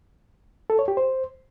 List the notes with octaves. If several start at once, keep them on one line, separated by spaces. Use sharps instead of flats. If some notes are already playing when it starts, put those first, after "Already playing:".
A4
C#5
G4
C5